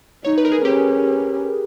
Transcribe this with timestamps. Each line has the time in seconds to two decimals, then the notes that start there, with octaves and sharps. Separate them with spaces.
0.24 D#4 C#5
0.38 B4
0.45 A#4
0.52 G#4
0.65 C#4 G4